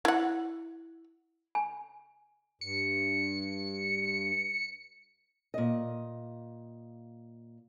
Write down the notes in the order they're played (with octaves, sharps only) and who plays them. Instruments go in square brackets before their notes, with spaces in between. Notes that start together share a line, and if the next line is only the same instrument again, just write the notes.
[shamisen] E4 F#5
[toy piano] G#5
[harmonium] G2 [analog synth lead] C#7
[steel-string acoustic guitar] A#2 D#5